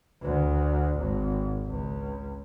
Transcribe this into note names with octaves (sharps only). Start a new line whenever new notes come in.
D2
G#1
C#2